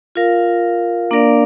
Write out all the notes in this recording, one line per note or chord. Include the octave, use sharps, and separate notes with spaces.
F4 A#4 F5
A#3 D4 A#4 D5 F5